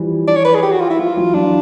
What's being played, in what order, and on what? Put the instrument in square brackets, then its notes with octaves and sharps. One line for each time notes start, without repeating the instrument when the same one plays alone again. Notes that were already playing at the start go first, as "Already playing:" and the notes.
Already playing: [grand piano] E3 F3 G3
[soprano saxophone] D5
C#5
B4
G#4
G4
F#4
F4
E4
[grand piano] F3 [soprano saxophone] F4
[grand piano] E3 F#3
[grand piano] E3 F#3 [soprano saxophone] D4